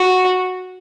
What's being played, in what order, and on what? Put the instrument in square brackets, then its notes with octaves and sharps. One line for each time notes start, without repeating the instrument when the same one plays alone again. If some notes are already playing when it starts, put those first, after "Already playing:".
Already playing: [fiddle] F#4